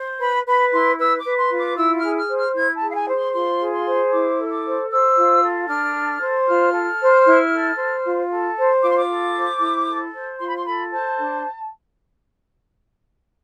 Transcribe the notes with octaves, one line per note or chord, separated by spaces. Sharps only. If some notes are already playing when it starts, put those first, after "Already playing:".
Already playing: C5
B4 B5
B4 B5
E4 C6
B4 E6
D6
B4
C6
F4
D6
E4 E6
F6
G#4
F6
C5
F6
E4 G#6
A5
G#4
F5
G#5
C5
C6
F4 C6
G#4
C6
C5
E4 D6
A4
D6
C5
C5 E6
F4
A4
D4 F6
A4
C5
F4 F6
A4
C5
E4
A4
C5
F4
A4
C5
F4 D6
C6
D6
A4
C5
E4
A4
C5
F4 C6
B5
C6
A4 B5
C5 A5
D4